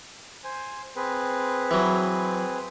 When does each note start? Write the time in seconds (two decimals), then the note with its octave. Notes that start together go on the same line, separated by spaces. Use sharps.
0.44 C5 G#5
0.96 C4 G#4 B4
1.71 E3 F#3